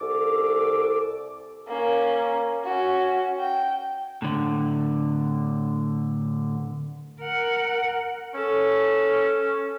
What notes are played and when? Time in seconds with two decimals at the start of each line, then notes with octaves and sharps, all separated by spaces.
0.01 C2 A4 D6
1.68 A#3 C#4
2.64 C#4 F#4
3.39 G5
4.22 A2 D3
7.21 A#4 F#5
8.36 C#4 A4